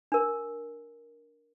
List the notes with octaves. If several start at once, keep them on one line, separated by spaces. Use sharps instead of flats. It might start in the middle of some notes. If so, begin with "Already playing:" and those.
D4 A#4